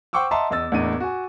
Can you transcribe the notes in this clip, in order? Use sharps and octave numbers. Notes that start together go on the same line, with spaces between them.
C5 F#5 G5 C#6 D6 E6
D#5 E5 F#5 A5 A#5 C6
E2 D#5 E6 A6
E2 A2 A#3 D4 D#5 D#7
F#4 G#5